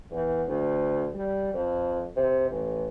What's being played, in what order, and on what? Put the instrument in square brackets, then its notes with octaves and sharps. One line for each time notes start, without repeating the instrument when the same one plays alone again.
[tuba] E2
D2
G3
F2
C3
A1